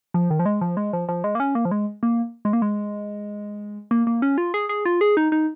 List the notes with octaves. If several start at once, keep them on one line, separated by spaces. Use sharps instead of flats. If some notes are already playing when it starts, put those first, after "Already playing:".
F3
D#3
F3
G#3
F3
G#3
F3
F3
G#3
A#3
C#4
A#3
F3
G#3
A#3
G#3
A#3
G#3
A#3
A#3
C#4
F4
G#4
G#4
F4
G#4
D#4
D#4